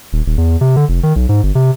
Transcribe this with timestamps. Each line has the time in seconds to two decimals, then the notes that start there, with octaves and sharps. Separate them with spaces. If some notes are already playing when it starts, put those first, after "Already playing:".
0.13 D#1
0.26 D#1
0.38 E2
0.61 C3
0.76 D3
0.89 F1
1.03 D#3
1.16 B1
1.29 G#2
1.43 G1
1.55 C3